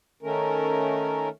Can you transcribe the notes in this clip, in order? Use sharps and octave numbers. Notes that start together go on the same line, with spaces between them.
D#3 A3 C#4 A#4